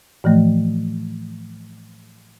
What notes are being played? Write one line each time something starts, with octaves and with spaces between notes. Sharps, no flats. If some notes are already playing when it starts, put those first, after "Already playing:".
A2 E3 F3 A3